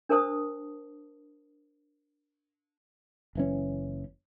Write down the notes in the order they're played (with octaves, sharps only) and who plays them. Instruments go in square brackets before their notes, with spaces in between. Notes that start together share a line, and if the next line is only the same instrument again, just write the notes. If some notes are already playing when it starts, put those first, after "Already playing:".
[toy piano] D4 A#4 C5 A5 D#6
[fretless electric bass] F#1 E3 C#4